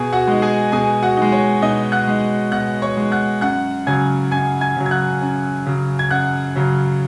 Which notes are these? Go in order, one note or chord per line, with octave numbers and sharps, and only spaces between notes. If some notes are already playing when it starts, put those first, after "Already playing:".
Already playing: B2 G#4 G#5
F#4 F#5
G#3 D#4
G#4 G#5
B2 G#4 G#5
F#4 F#5
G#3 D#4
C#5
B2 D#4 D#5
F#5 F#6
G#3 D#4
B2 F#5 F#6
C#5 C#6
G#3 D#4
F#5 F#6
F#2 F#5 F#6
C#3 F#3 G#5 G#6
F#2 G#5 G#6
G#5 G#6
C#3 F#3
G#6
F#5 F#6
F#2
C#3 F#3
G#6
F#2 F#5 F#6
C#3 F#3